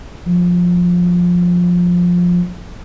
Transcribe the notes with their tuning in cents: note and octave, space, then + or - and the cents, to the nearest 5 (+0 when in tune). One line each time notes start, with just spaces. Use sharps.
F3 +15